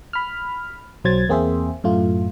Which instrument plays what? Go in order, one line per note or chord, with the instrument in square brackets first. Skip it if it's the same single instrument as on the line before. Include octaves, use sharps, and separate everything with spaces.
[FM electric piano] B5 F6
B1 F#3 C5 G#6 A6
E2 A#3 C4 G#4 C5 E5
F#2 A2 A3 F4